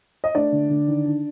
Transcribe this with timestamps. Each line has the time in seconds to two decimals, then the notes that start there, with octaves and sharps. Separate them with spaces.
0.24 D#5
0.35 A3 D4 D5
0.52 D3
0.69 D3
0.88 D#3
1.05 D4